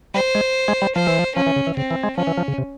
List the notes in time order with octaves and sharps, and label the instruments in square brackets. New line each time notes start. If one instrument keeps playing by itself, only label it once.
[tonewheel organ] G3 [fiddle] C5
[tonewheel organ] G#3
G#3
G3
[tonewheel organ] F3 [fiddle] C5
[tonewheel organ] E3
F3
[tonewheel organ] F3 [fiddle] C#4
[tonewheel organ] E3
C#3
E3
[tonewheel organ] C#3 [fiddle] C4
[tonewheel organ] E3
G#3
[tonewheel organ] F3 [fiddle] C#4
[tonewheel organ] E3
F3
C#3
C3